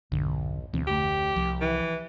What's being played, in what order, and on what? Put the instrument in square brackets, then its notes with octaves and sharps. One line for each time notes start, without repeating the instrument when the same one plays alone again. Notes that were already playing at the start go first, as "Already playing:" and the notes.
[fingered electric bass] E1 G2 D3 [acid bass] B1
[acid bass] D2 [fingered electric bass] B2 E3 C4
[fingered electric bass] F1 D3 A3 [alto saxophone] G4
[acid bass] C2 [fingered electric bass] F3
[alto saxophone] E3